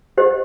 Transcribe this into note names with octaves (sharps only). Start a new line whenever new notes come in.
G4 C5 D#5